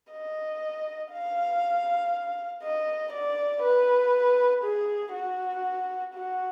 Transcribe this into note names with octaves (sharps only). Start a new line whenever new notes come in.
D#5
F5
D#5
D5
B4
G#4
F#4
F#4